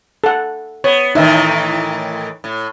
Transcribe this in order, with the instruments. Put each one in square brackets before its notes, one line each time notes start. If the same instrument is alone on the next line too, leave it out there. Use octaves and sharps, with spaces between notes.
[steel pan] A4 F#5
[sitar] B3 [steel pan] C#5
[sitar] A2 D#3 E3 [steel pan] D#4 E5
[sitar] A2